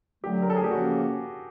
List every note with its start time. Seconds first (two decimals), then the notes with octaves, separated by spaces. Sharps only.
0.24 D3 F#3 A3 G4
0.42 A#4
0.50 A4
0.56 G#4
0.64 G4
0.71 C#3 F3 A#3 C#4 F#4